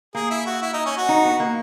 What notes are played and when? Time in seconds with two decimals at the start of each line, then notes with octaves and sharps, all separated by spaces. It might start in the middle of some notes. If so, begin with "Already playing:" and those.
0.15 A#3 G#4
0.30 E4
0.46 F#4
0.62 E4
0.74 D#4
0.86 C#4
0.97 F#4
1.09 D#4
1.25 B3
1.40 A#3